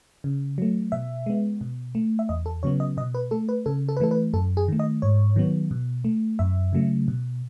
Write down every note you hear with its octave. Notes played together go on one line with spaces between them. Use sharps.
C#3
F#3 A3
B2 E5
G#3 B3
B2
A3
E5
E2 D#5
A4
C#3 F#3 B3 C#5
D#5
B2 D#5
B4
A3 A4
B4
C#3 A4
A4
B4
E3 A3 A4
B4
F#2 A4
G#4
D#3 A3
D#5
G#2 C#5
D#3 F#3 B3
B2
A3
F#2 E5
C#3 F#3 A3
B2